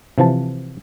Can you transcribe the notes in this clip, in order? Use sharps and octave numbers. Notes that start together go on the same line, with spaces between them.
C3 E3 F3 A5